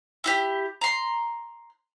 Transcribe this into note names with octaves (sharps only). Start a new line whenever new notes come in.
E4 F#4 G4
A#5 C6